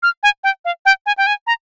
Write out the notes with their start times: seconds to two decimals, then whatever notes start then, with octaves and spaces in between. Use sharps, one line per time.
0.03 F6
0.23 G#5
0.44 G5
0.65 F5
0.86 G5
1.06 G#5
1.18 G5
1.27 G#5
1.47 A#5